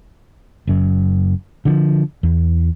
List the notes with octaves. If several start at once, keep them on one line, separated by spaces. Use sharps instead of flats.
F#1 F#2
D3 D#3 F3
E2